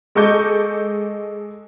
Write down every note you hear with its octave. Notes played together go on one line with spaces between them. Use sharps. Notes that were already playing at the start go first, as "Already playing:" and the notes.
G#3 A4 D#5 C#6 D6 G6